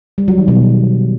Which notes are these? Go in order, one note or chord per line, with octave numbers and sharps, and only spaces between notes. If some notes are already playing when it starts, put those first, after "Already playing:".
G3
F#3
D#3
B2